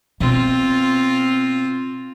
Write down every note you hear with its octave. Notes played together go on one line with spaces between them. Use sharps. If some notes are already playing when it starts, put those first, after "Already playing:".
B2 C4 F4